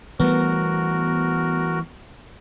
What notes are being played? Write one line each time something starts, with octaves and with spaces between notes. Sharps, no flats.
E3 G3 A3 B3 F#4 A#4